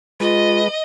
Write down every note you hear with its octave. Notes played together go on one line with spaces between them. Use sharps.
G#3 F4 B4 D#5